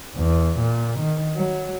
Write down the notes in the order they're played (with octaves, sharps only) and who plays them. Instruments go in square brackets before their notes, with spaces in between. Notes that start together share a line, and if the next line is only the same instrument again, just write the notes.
[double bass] E2
A#2
D#3
F#3